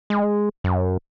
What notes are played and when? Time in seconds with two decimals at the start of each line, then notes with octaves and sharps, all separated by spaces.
0.10 G#3
0.64 F#2